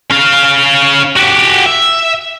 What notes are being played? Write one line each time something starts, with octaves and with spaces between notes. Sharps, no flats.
C#4 F5
F#4 G4
E5